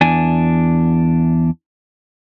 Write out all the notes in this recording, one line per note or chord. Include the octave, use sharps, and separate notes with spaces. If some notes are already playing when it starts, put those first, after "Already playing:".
E2 D4 D5 G#5